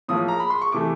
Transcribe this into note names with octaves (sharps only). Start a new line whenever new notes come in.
A2 F3 A#3 D#6
A#5
B5
C6
C#6
C3 E3 A3 D6